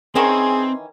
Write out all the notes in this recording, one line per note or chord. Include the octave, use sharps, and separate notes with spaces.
D#3 E3 C4 C#4 G#4 C6